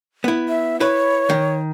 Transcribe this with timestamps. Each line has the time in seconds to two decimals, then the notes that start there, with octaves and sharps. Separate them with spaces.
0.24 B3 E4
0.49 E5
0.80 E4 B4 C#5
1.30 D#3